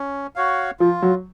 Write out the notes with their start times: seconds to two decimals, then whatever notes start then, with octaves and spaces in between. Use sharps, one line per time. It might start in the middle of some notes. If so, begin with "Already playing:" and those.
Already playing: C#4
0.36 F#4 C#5 F5
0.80 F3 F4
1.02 F#3